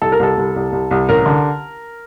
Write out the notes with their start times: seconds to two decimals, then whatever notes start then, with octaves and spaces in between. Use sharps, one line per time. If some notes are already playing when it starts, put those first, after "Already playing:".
0.01 C2 A4
0.12 A#4
0.19 C2 A4
0.37 C2
0.56 C2
0.72 C2
0.91 C2
1.09 A1 A#4
1.26 D3